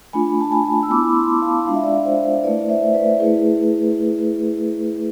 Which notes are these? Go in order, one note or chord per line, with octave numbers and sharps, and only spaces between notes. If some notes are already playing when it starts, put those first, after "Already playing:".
A3 D4 F4 G#5 B5
A5
G#5 B5
E6
B3 E4 B5 D6
A5 C6
F5 A5
G#3 D4 F4 F5
E5
D5 F5
C5 E5
A3 E4 B4 D5
C5 E5
B4 D5
A3 E4 G#4 B4